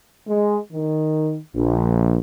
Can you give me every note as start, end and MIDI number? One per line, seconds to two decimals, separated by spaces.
0.27 0.59 56
0.72 1.38 51
1.55 2.19 34